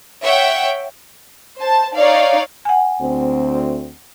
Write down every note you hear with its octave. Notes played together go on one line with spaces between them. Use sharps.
C#5 E5 F#5 G5
C5 A5
D#4 C#5 D5 F5
F#5 G#5
D2 C4